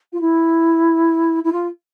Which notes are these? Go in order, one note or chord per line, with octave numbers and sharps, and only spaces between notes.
F4
E4
E4
F4